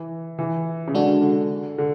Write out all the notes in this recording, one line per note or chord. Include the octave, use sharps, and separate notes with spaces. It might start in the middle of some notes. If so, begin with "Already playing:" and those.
Already playing: E3
E3
C#3
D3 G#3 D4 F#4
D3
D3